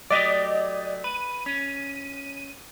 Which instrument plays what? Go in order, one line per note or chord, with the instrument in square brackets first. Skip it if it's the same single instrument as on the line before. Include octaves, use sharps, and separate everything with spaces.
[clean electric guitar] F#3 A3 G4 [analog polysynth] D5 D#5
[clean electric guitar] B4 [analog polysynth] D#7
[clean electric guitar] C#4